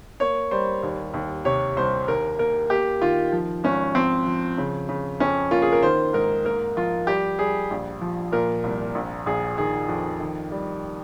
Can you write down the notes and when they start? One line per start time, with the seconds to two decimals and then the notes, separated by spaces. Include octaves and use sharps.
0.20 A#3 C#5
0.51 G3 C5
0.83 D#2
1.14 D#2
1.45 C3 C#5
1.77 C2 C5
2.08 D#2 A#4
2.39 A#3 A#4
2.70 A#3 G4
3.02 D#3 F4
3.32 F3
3.63 G#1 C#4
3.95 F3 C4
4.26 F3
4.58 C#3
4.89 C#3
5.20 F2 C#4
5.51 A#3 F4
5.62 G#4
5.73 A#4
5.83 D#3 C5
6.13 G#2 A#4
6.45 A#3 A#4
6.76 F3 F4
7.07 G3 G4
7.39 G3 G#4
7.71 A#1
8.01 F3
8.32 A#2 A#4
8.64 C2
8.95 A#1
9.26 A#1 G#4
9.58 D#3 G#4
9.89 F2
10.20 D#3
10.52 G3